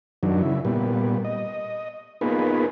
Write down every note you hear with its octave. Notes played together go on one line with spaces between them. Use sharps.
F#2 D#3 F#3 D4
C#3 E4
A#2 G3 B3
D#5
A#3 B3 D#4 F4 G#4 B4